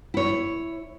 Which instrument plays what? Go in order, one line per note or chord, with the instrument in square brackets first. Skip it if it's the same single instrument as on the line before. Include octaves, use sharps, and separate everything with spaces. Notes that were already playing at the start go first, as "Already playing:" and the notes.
[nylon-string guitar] E4 C#5